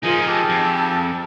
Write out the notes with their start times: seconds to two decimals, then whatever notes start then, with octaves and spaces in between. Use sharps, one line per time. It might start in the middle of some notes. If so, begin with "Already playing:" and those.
0.03 F3 D#4 F4 G#4 A#4 G#5
0.28 G4 G#4 A5 E6
0.50 F2